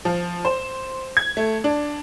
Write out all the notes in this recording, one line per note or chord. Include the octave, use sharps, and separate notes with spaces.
F3
C5
G#6
A3
D4